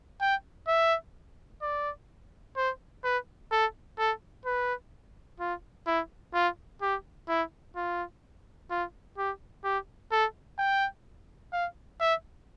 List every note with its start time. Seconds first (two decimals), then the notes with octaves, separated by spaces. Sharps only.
0.21 G5
0.68 E5
1.62 D5
2.57 C5
3.04 B4
3.52 A4
3.98 A4
4.46 B4
5.40 F4
5.87 E4
6.34 F4
6.82 G4
7.29 E4
7.76 F4
8.71 F4
9.18 G4
9.64 G4
10.12 A4
10.59 G5
11.53 F5
12.00 E5